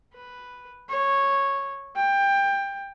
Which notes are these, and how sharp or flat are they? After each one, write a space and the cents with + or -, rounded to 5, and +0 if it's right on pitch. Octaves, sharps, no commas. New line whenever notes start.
B4 +0
C#5 -10
G5 +20